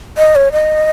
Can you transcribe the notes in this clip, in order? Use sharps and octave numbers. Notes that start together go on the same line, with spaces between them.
D#5
C#5
D#5